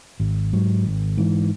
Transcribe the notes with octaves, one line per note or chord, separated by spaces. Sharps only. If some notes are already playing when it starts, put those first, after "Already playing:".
G#1
G#2 F#3
G#1
G#2 E3